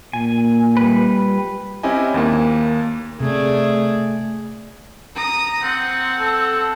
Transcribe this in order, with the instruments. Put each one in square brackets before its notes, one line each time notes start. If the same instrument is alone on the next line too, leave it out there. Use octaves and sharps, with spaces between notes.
[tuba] A#2 [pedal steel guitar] G#5
[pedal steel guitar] G3 B4
[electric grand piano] C4 C#4 E4 G4 D#5 G#5
D#2 A#3
[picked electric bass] C3 [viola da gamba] A3 [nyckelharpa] G#4 D5
[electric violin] A#5 D#6
[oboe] C4 [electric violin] F#5
[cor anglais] A4